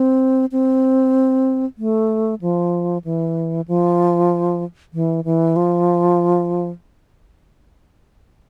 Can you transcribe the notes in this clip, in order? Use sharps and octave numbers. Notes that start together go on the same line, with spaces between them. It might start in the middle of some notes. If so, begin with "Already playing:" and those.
Already playing: C4
C4
A3
F3
E3
F3
E3
E3
F3